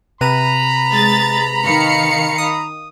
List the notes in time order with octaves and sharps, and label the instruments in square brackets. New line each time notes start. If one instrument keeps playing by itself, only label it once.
[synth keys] C3 B4 D#7 [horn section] A#5 B5
[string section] G#3 A6
D#3 F5 C#7
[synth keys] D#6